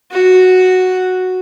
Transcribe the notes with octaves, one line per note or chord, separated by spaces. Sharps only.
F#4